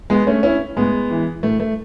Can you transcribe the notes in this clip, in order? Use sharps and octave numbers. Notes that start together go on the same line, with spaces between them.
B2 G#3 B3
A3 C#4
C#4 E4
A2 G#3 B3
E3
A2 A3
A3